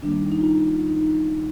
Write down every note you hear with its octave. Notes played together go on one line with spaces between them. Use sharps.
D#3 G3 A#3 D4
D#4
D#4
F4
F4
D#4